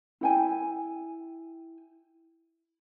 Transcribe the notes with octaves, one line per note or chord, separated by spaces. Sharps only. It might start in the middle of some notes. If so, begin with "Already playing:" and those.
E4 G5 G#5